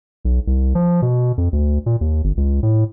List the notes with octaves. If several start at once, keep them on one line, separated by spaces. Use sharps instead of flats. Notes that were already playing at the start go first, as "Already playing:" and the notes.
B1
C2
F3
B2
F2
D2
A#2
D#2
G1
C#2
A2